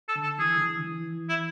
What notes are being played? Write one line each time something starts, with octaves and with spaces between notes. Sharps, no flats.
A4
D3
A4
E3 G#4
D3
E3
D3
E3
E4